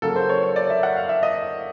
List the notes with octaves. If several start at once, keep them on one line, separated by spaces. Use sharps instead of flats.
C#3 F#3 A#3 A4
C5
C#5
C#5
D5
E5
F#5
F5
E5
D#5